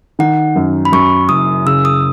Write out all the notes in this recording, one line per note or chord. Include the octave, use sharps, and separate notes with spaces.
D#3 F#5
F#2
B5
F#2 C#6
F#1 D#6
C#3 E6
D#6